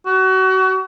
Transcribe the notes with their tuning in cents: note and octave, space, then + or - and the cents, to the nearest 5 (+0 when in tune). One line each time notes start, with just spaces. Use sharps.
F#4 +30